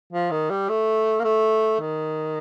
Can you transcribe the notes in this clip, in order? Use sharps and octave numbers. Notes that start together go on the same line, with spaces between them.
F3
D#3
G3
A3
A#3
A3
D#3